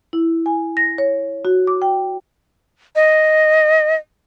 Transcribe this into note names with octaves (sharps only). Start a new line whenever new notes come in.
E4
G#5
A#6
C#5
F#4
D6
G5
D#5